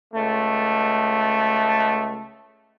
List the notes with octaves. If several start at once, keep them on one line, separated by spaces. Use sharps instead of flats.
C#2 A3